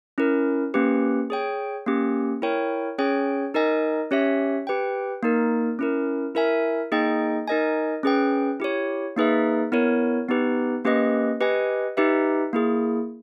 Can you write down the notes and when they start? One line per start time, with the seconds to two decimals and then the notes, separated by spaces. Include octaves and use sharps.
0.18 C#4 E4 A#4
0.74 A#3 C#4 G4 B4
1.30 G#4 C#5 G5
1.86 A#3 C#4 G4
2.42 E4 A#4 C#5 G5
2.98 C#4 G#4 C#5 G5
3.54 D#4 A#4 D#5 G#5
4.11 C#4 G4 C#5 E5
4.67 G4 B4 G5
5.23 A#3 D#4 A#4
5.79 C#4 E4 A#4
6.35 E4 A#4 E5 G#5
6.92 A#3 D#4 G#4 D#5 G5
7.48 D#4 A#4 D#5 G#5
8.03 C#4 G#4 B4 G5
8.60 E4 G4 C#5
9.17 A#3 D#4 G#4 B4 E5
9.72 B3 E4 A#4 C#5
10.29 B3 D#4 G4 B4
10.85 A#3 C#4 G4 B4 D#5
11.41 G4 B4 D#5 G#5
11.97 D#4 G4 B4 E5
12.53 A#3 E4 G#4